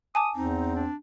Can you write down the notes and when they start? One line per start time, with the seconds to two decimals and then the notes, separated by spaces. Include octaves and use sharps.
0.15 G#5 A5 D6 D#6
0.36 E2 C4 D#4
0.76 D4